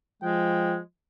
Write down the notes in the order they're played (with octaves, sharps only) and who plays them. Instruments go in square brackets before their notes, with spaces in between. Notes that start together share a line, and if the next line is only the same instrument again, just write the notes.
[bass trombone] F3 [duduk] G#3 [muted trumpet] G5